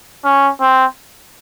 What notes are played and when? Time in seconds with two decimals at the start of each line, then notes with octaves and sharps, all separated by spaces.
0.25 C#4
0.60 C4